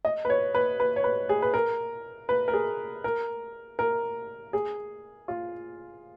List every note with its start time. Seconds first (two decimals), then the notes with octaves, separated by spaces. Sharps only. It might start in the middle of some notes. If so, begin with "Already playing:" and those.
0.05 D#5
0.25 B4
0.30 C#5
0.55 B4
0.80 B4
0.96 C#5
1.04 B4
1.29 G#4
1.42 B4
1.54 A#4
2.29 B4
2.48 A#4
2.53 G#4
3.04 A#4
3.79 A#4
4.53 G#4
5.28 F4